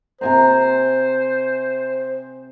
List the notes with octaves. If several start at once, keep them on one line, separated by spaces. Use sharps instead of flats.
C3 C5 G#5 A#5